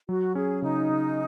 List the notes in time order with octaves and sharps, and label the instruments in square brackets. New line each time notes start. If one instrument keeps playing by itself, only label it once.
[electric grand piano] F#3 [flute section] F#4
[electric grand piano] C#4 [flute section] G#4
[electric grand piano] C#3 [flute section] D#4
[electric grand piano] C#3